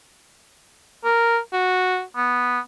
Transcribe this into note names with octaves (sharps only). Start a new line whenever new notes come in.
A#4
F#4
B3